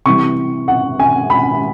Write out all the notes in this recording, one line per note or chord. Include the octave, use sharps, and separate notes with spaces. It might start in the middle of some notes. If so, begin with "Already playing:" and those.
C3 E3 G3 C#6
F#5
G#5
B5